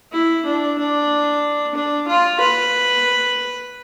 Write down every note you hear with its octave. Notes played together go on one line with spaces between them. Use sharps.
E4
D4
D4
D4
F4
B4